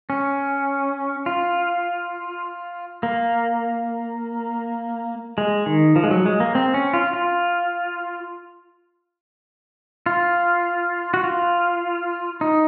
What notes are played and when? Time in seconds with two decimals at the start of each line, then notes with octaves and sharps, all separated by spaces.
0.10 C#4
1.26 F4
3.03 A#3
5.38 G#3
5.66 D#3
5.96 F3
6.04 G#3
6.11 F#3
6.25 G#3
6.40 A#3
6.55 C4
6.74 C#4
6.94 F4
7.13 F4
10.06 F4
11.14 F#4
11.24 F4
12.41 D#4